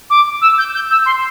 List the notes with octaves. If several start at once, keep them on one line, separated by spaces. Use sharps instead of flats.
D6
E6
G6
G6
E6
C6